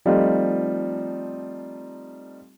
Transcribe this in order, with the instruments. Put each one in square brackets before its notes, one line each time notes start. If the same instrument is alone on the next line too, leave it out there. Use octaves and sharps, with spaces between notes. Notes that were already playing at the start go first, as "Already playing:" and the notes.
[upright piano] F3 G3 A3 C4 D#4 F4